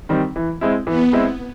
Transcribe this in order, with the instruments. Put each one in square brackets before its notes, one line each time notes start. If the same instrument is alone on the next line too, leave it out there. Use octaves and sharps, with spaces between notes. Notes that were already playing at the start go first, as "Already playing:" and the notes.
[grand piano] D#3 G3 C4
E3
G#3 C4 E4
[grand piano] E3 [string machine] B3
[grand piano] G#3 C4 E4